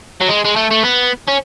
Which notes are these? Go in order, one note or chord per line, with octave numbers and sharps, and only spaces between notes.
F#3
G#3
G#3
A3
A3
B3
C#4